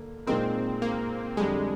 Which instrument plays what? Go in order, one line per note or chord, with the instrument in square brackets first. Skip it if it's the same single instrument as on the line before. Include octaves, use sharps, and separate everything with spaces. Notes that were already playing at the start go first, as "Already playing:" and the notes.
Already playing: [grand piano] D3 A#3
[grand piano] A#2 G#3 D#4 A#4 [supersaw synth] C4
[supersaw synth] A#3
[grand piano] F2 D3 G3 D4 G4 [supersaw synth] G#3